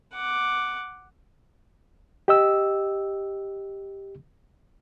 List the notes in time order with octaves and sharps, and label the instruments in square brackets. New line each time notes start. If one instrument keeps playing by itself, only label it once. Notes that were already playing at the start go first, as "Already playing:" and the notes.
[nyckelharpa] F#5 D6
[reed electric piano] G4 D#5 E6